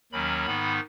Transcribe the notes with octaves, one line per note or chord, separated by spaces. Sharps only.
D#2 D#3 F#3 C#4 B5
G#2 D#3 B3 D#4